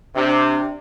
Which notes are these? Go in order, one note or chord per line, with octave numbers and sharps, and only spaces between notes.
C3 D4